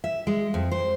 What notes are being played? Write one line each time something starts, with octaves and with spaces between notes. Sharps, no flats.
E5
G#3
F2
C5